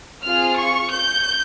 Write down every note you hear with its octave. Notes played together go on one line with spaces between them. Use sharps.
C4 F4 G#4 F6
C#6
G6